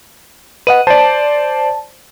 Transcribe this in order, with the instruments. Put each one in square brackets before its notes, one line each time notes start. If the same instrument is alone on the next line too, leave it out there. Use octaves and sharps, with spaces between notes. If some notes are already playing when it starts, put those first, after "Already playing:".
[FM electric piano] B4 D#5 F#5 [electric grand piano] D#7
[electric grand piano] C5 D5 [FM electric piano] A5